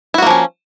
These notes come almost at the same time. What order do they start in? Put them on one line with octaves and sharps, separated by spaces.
E4 F#4 A#3 F3 C#4